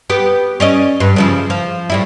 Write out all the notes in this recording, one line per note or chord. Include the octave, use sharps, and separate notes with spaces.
B3 G4
C#4 D5 D#5
G2
C#3 F3 E4
F3
A2 G3 E4